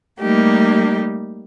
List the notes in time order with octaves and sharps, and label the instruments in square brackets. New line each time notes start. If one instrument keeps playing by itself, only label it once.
[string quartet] G3 A3 A#3 D#4 G4